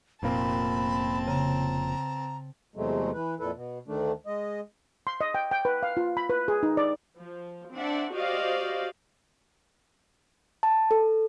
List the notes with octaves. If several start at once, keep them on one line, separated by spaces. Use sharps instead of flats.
F1 A#2 A#3 C4 A5 B5
C#3 A#5
E2 C3 F#3 G#3 A3
E3 B4
F2 A#2 E4 A4 B4
B2
D2 D#3 A3 D4
G#3 D#5
C6
D#5
G5
G5
B4
F5
F4
B5
B4
G#4
D#4
D5
F3
C4 D4 D5 E5 F#5
F#4 G4 C5 D5 D#5 F5
A5
A4